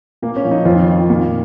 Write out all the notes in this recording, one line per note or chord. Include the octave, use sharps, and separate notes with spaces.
A#2 A#3
C#4
F3
D#4
F2 F4
D#3
A#2